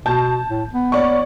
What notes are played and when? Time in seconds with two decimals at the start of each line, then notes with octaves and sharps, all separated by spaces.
0.06 B2 A5 G6
0.49 A2
0.73 B3
0.92 C#5 D5 C#6